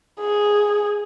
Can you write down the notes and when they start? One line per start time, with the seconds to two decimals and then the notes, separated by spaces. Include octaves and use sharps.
0.20 G#4